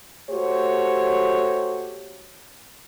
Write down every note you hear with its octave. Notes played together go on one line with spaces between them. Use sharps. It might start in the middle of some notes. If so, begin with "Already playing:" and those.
A3 F#4 G4 C5 C#5